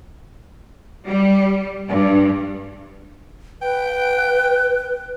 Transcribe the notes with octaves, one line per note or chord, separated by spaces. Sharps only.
G3
G2
B4 G5